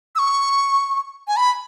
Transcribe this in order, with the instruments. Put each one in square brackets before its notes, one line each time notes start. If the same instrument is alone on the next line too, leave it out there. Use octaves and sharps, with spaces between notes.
[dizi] E6
C#6
G#5
B5